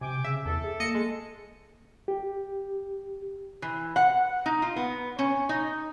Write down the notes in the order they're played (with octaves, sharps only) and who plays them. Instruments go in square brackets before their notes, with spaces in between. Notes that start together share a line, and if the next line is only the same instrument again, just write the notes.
[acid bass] C3 [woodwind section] G5 G#5 D6
[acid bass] C#3 [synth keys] E5
[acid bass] E2 [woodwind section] A4
[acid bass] G#4
[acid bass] A#3 [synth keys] D#5 C#7
[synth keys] G#3
[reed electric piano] G4
[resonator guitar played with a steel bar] E3
F#5
D#4
F4
B3
C#4
D#4